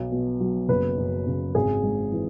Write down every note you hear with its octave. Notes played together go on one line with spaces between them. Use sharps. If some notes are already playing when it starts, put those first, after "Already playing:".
Already playing: B1
B2
F#3
F#1 B4
F#2
C#3
G#1 G#4
G#2
E3